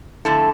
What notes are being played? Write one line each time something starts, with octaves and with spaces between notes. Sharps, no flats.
F2 D3 A3 E4 A4